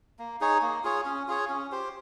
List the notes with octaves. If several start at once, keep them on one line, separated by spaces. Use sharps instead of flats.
A#3
D#4 G#4 C#5
A#3
F4 G#4 C#5
C#4
F4 G#4 C#5
C#4
G4 C5